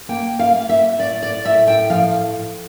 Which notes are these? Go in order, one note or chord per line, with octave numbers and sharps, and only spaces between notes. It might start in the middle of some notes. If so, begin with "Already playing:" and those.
A#3 G5
F5
A#3
E5
A2 D5
D5
A2 E5
G5
F3 F5